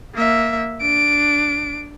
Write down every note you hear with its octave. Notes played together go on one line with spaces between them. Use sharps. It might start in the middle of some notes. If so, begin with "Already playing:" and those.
A#3 E5
D4 D7